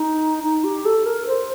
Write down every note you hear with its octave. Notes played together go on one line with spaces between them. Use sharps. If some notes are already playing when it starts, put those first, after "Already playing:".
Already playing: D#4
D#4
G4
A4
A#4
C5